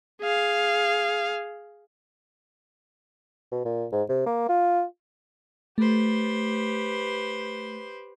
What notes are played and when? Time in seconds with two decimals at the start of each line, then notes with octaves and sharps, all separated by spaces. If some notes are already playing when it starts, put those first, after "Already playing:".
0.21 G#4 F5
3.52 B2
3.65 A#2
3.92 G#2
4.09 C3
4.26 A#3
4.49 F4
5.78 A3 G4 B4 C5